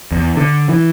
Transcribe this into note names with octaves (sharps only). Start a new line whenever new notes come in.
E2
D3
E3